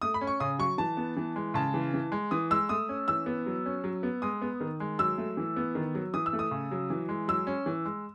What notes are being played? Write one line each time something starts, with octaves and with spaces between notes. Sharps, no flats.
A3 D#6
B5
C#4
C#6
C#3 D#6
F#3 C#6
E3 A5
B3
E3
G#3
C#3 A5
E3
E3
G#3
E3 D#6
G#3 E6
A3 D#6
C#4
E3 E6
B3
F#3
C#4
F#3
B3
G#3 D#6
B3
D#3
G#3
F#3 E6
A3
E3
B3
D#3
F#3
E3 D#6
E6
A3
D#6
C#3
F#3
E3
G#3
F#3 E6
C#4
E3
G#3